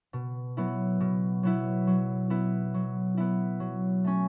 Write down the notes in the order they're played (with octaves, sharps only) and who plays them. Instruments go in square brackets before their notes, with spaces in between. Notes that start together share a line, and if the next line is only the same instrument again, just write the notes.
[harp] B2
F#3 B3 E4
B2
F#3 B3 E4
F#3
B3 E4
F#3
B3 E4
F#3
A3 C#4